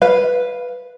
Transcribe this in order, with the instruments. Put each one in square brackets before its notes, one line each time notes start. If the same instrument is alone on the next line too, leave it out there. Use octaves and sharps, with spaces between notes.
[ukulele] B4 F5